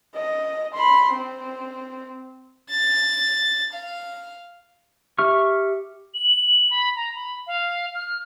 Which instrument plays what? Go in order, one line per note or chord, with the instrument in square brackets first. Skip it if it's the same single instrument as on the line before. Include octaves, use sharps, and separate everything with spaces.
[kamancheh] D#5
B5 C6
C4
[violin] A6
F5
[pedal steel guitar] G4 E5 C#6 F6
[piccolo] F#7
B5
A#5
B5
F5
F6